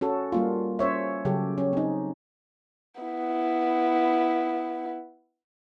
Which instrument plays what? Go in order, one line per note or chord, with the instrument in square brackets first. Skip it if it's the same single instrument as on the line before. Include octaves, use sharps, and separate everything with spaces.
[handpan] C#4 F#4 A4
G3 A#3 F4
C#4 C5 C#5 E5
C#3 F#3 G4 A4
C#4
C4 D#4
[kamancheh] B3 E4